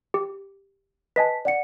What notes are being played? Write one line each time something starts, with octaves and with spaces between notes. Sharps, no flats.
G4
B4 D#5 G#5 A5 B6
D5 F#5 C#7